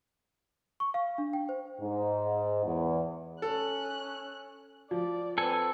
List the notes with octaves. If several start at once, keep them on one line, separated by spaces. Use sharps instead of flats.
C#6
F5
D4
G5
C5
G#2
E2
C#4 A4 F#6
F3 D5
C4 A4 B4 G#5